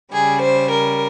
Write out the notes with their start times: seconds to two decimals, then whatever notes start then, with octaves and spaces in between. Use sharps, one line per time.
0.13 C#3 G3 G#4
0.42 C5
0.72 A#4